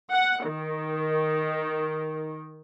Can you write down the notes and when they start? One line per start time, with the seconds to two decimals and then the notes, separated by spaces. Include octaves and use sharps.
0.11 F#5
0.45 D#3